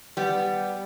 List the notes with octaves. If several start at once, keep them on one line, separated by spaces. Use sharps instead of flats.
G3 B3